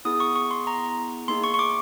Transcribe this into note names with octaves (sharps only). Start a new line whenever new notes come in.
B3 E4 G#4 D#6
C#6
C#6
C6
A#5
A#3 D#4 G#4 C6
C#6
C#6
D6